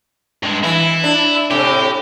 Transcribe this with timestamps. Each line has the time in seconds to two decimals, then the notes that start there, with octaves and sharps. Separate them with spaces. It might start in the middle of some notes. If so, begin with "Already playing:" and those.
0.43 G2 G#3
0.64 E3 E4
1.04 D4
1.51 A2 C3 G4